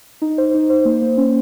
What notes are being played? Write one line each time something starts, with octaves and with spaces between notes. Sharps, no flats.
D#4
C5
D#4
C5
A#3
A#3
C#4